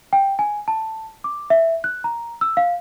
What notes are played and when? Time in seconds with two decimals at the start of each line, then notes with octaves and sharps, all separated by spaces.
0.13 G5
0.39 G#5
0.68 A5
1.24 D6
1.50 E5
1.84 F#6
2.04 A#5
2.41 E6
2.57 F5